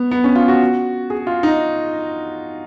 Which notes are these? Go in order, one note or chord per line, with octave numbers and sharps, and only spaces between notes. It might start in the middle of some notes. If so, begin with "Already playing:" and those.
Already playing: B3
B3
C#4
F4
F#4
G#4
F4
D#4